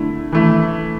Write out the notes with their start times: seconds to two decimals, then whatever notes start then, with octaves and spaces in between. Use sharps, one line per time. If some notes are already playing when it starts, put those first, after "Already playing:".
Already playing: D3 A3 E4
0.32 E3 A3 E4